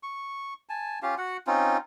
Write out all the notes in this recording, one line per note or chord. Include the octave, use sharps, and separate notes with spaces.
C#6
G#5 A5
C#4 F4 G4 F5
F#4 F#5
C4 C#4 D#4 F4